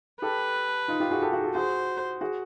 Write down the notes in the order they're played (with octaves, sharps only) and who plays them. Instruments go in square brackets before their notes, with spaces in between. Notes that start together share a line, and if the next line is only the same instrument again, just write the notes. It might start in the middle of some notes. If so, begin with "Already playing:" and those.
[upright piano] G4 A4 [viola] B4
[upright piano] D#4 F4
F4 G4
F#4 G#4
G4 A4
F#4 G#4
G4 A4
[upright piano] F#4 G#4 [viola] C5
[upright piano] F#4 G#4